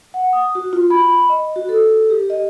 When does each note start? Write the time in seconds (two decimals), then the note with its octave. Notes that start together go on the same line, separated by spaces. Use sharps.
0.14 F#5
0.33 D#6
0.55 F#4
0.73 F4
0.90 B5
1.29 D#5
1.56 F#4
1.69 A4
2.10 G4
2.30 D#5